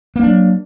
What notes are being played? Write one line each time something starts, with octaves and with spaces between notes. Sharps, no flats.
F#3 A#3 C#4 D4